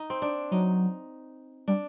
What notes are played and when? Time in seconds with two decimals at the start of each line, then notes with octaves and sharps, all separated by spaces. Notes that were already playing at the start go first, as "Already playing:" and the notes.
Already playing: D#4
0.10 C4
0.22 D4
0.51 F#3 D#4
1.68 G3 D4